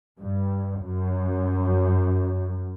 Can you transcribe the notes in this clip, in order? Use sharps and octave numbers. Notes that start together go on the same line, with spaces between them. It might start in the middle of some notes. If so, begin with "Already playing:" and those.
G2
F#2